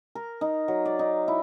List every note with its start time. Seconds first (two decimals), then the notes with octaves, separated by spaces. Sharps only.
0.15 A#4
0.41 D#4
0.68 F#3
0.85 D5
0.99 D#4
1.28 E4